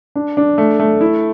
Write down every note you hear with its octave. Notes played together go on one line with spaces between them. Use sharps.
D4
D4
A3
A3
E4